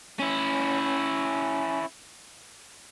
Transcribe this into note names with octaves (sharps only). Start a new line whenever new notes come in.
C#4 E4